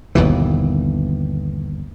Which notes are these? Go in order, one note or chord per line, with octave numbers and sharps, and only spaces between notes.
G1 D#2 B2 E3